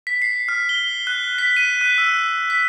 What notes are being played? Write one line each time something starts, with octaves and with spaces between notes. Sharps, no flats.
B6
C7
F6
G7
F#6
B6
D#7
F#6
E6
B6